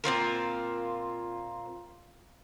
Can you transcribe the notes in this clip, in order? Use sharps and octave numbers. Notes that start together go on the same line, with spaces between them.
A#2 C4 F4 A#4